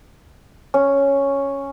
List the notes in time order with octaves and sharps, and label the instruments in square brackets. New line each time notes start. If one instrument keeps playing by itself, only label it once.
[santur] C#4